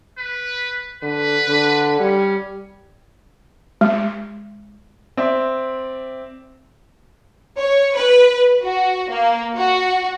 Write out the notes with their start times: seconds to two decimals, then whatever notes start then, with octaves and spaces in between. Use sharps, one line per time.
0.19 B4
1.03 D3 B4
1.48 D3
2.00 G3 C#4
3.81 G#3
5.17 C4 D5 E5
7.59 C#5
7.96 B4
8.62 F#4
9.09 A#3
9.55 F#4